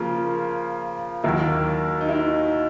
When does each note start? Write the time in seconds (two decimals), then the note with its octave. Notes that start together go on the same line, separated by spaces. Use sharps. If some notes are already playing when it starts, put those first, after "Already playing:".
Already playing: C#3 F3 A#3 F4
1.23 D#2 D#3 F#3 A#3 E4
2.01 D#4
2.08 E4
2.15 D#4